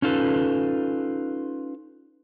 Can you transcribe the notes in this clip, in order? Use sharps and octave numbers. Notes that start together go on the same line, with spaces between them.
C#4 D#4 F4 A4 B4